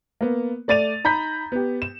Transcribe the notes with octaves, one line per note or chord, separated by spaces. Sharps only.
A#3 B3
A3 D5 A6 D#7 F7
D#4 A#5 B5 G6 B6
B3 G4
E7